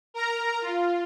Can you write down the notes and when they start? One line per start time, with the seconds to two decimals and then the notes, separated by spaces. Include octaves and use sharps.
0.14 A#4 A#5
0.61 F4